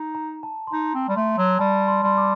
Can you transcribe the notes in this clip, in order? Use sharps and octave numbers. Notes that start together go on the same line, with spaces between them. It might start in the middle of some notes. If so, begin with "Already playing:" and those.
Already playing: D#4
A#5
A5
C6
D#4 A#5
C4
G3
A3 C6
F#3
G3 A5
C6
G3 C6
D6